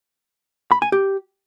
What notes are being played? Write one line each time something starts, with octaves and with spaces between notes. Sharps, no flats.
B5
G#5
G4